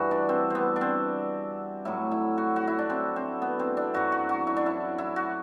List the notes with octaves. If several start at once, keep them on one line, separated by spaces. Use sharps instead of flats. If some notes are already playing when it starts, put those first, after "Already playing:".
Already playing: G2 E3 F#4
D4
C4
B3 C4
D4
C4
A2 F#3 E4
E4
F#4
F#4
E4
D4
C4
C4
B3
C4
D4
F#2 F#3 F#4
F#4
F#4
E4
D4
E4
E4
F#4